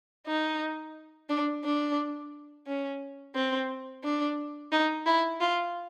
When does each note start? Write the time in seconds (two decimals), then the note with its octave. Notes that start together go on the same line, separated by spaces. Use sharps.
0.27 D#4
1.29 D4
1.64 D4
2.67 C#4
3.35 C4
4.04 D4
4.72 D#4
5.06 E4
5.40 F4